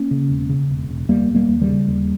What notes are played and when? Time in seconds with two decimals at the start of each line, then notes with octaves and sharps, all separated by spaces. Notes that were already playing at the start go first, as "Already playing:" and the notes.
Already playing: A#3 C#4
0.11 C#3
0.29 E1
0.50 C#3
0.69 E1
0.89 E1
1.09 D#2 G3 A#3
1.28 E1
1.35 G3 A#3
1.48 D#2
1.61 D#3 G3
1.67 C#3
1.88 D#2